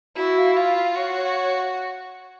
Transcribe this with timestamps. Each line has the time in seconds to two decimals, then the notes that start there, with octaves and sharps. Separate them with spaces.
0.16 E4 F#4
0.36 F5
0.55 F4 F5
0.76 F5
0.95 F#4 C#5
1.15 C#5